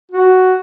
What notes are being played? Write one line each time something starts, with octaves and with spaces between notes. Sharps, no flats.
F#4